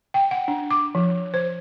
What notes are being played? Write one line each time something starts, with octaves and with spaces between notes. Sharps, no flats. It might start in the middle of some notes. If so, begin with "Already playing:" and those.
G5
F#5
D4
D6
F3
C5